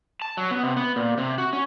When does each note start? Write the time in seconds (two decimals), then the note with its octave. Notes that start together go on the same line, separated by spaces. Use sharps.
0.22 A5
0.37 F#3
0.51 B3
0.63 C3
0.77 B3
0.96 A#2
1.18 C3
1.38 F#4
1.53 C#4